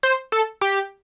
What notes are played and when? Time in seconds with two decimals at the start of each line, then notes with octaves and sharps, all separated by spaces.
0.03 C5
0.32 A4
0.61 G4